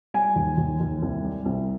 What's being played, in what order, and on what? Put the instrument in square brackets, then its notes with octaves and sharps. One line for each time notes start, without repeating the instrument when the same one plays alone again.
[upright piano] G3 G#5
D#2
D#2
D#2
C2
G3
C2